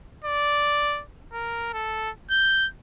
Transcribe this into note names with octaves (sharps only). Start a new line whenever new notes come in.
D5
A#4
A4
G6